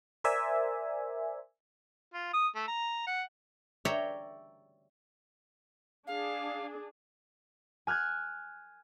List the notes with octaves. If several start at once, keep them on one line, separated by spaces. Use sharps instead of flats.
A#4 C5 D5 E5 G#5
F4
D#6
A3
A#5
F#5
C#5 D5 E5 G5 A#5
D4 G#4 F5
G#5 F6 F#6 G#6